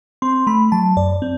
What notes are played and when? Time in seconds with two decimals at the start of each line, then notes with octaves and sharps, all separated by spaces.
0.22 C4 C6
0.47 A3 B5
0.72 F#3 A5
0.97 F#2 D5
1.22 C4